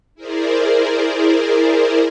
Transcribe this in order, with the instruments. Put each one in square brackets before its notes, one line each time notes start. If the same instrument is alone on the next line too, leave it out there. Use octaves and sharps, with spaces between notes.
[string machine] E4 G#4 A#4 C5 D5